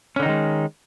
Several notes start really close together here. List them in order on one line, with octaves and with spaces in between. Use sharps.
C#4 D3 D#4 D#3 G#3